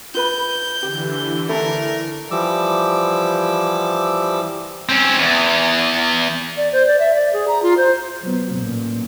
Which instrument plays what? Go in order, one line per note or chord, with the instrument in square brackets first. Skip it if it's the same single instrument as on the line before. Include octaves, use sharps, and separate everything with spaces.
[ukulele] F4 B4 B5 [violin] G6
[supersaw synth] D3 E3 [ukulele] G4
[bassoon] A3 [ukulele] E4 [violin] A#4
[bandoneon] E3 F3 G3 D6 E6
[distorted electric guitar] C4 C#4
E2
[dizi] D5
C5
D5
E5
D5
G#4
A#5
F4
C5
[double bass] F#3 B3
A1 A#2